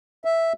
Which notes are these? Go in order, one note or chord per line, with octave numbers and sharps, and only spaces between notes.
E5